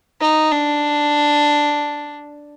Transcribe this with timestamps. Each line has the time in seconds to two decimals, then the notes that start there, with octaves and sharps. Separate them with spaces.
0.21 D#4
0.52 D4